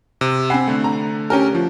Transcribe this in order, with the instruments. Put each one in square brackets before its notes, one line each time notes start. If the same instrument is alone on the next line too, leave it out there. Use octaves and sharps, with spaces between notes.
[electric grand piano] C3
[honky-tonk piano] C4 F#5 [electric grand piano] G#5 B5 C7
[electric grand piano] D3 A3
[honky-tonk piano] A#5
C#4 G4 A#4
F3